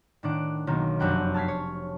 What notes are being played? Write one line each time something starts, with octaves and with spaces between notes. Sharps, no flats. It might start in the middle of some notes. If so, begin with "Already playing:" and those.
A2 D#3 D4 F#5 D7
B1 D#3 A#3
F1 F#2 D4 F#5 G5 B5
A5 F6 G#6 B6 C7
C#5